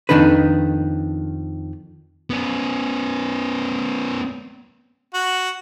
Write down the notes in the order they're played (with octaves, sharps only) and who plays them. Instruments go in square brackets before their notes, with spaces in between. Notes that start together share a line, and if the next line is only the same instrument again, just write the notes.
[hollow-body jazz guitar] F2 B2 D#3 D4 D#4 B4
[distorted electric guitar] B3 C#4
[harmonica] F#4